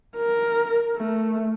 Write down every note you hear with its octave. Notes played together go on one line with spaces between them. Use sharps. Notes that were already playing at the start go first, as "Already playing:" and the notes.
A#4
A3